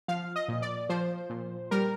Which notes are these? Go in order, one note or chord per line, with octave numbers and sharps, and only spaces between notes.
F3 F5
D#5
A#2
D5
F3 C5
A#2
G3 A#4